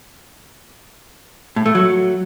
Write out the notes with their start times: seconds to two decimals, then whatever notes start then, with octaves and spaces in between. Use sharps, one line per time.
1.56 A2
1.66 A3
1.75 F#3